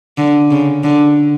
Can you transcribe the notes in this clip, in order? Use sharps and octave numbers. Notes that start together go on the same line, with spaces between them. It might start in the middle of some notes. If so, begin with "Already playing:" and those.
D3
C#3
D3